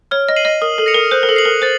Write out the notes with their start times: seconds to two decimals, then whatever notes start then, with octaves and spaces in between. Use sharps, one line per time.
0.11 C#5 F6
0.29 D#5
0.36 C7 D#7 F#7
0.45 D#5
0.62 A#4 D#6
0.78 A4
0.86 A#6 C#7 F7
0.94 A#4
1.11 C5 F#6
1.23 A#4
1.29 A4
1.36 C7 F#7
1.45 A#4
1.62 C5 A6